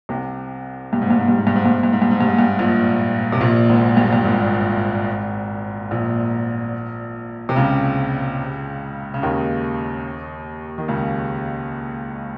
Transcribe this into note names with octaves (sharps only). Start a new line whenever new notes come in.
C2 C3
G2
G#2
G2
G#2
G2
G#2
G2
G#2
G2
G#2
G2
G#2
G2
G#2
G2
G#2
G2
A#1 A#2
C3
A#1 A#2
G#1 G#2
G2
G2
G#1 G#2
A#1 A#2
C3
C#2 C#3
C#3
D#2 D#3
D#3
C#2 C#3